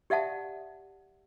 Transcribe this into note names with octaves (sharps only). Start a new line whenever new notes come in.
G4 D5 E5 F#5 A5